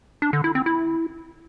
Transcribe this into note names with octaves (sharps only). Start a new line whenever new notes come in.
D4
D3
E4
C4
E4